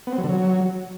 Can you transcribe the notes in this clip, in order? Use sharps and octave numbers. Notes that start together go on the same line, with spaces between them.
B3
C4
F#3
D3
F#3